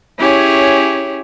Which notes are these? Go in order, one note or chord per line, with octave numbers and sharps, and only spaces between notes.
C#4 E4 G4 G#4 C#5